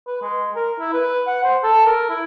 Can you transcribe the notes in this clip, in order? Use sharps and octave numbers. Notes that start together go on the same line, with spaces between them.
B4
G#3
A#4
E4
B4
F#5
C5
A4
A#4
E4